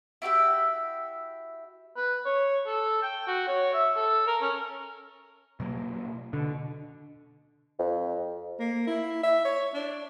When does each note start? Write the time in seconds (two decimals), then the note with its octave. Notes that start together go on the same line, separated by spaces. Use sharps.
0.22 E4 F#4 G4 E5
1.96 B4
2.25 C#5
2.67 A4
3.03 G5
3.27 F#4
3.48 C#5
3.74 E5
3.96 A4
4.27 A#4
4.41 C#4
5.60 B2 F#3 A#3
6.33 B2 D3
7.79 F2
8.60 A#3
8.87 E4
9.24 E5
9.45 C#5
9.74 D4